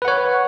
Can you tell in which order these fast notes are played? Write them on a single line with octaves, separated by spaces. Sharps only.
B4 F#5 C#5